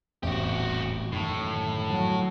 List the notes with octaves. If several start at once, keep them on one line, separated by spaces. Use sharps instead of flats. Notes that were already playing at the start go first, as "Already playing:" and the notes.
D#1 A1 E2 C4 F#4 G4
F#2 A2 D3 D#3
F#3